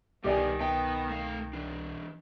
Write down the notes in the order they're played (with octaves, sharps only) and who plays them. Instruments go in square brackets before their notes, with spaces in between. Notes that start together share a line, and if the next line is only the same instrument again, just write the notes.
[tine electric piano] C2 B2 [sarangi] D#3 [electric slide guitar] G3 B3 [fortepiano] G4 D5 G#5
[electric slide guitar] B3 [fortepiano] G5
[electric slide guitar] A3 F5
E3 D4